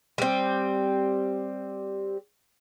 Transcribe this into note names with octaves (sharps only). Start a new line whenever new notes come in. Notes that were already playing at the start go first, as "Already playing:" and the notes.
G3 C4